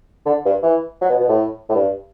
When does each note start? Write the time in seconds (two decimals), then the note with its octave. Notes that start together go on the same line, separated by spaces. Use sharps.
0.26 D3
0.45 G2
0.63 E3
1.01 F#3
1.09 B2
1.20 B2
1.28 A2
1.69 A2
1.75 G2